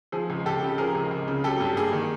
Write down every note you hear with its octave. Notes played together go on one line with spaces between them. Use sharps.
F3 G#4
C#2
C#2 G4 A4
C#3
F3 G#4 A#4
C#2
C#2
C#3
F#3 G4 A4
G2
A#3 G#4
D#3